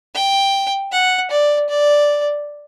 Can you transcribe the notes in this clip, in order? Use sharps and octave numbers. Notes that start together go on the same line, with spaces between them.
G5
F#5
D5
D5